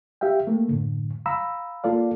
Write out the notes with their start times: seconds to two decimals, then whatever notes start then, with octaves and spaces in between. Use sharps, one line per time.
0.21 G4 E5 F5 G5
0.47 A3 A#3
0.68 F#2 A2 D3
1.26 F5 A#5 B5 E6
1.84 A#3 F4 A4 D5 F5